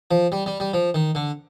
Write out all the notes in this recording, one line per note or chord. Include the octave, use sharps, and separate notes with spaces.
F3
G3
G3
G3
F3
D#3
D3